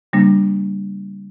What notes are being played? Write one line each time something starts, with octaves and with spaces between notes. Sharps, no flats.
C#3 G3 A#3 D4